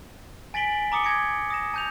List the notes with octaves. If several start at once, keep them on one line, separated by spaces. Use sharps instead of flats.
G#5 A6 B6 D7 F#7 G7
A#5 D6 D#6 C#7 G7
G#6 A#6 C#7 D7
D#6 A#6 E7
A5 G6 F7